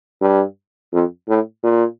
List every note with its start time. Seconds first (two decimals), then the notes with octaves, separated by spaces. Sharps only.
0.21 G2
0.93 F2
1.28 A2
1.63 A#2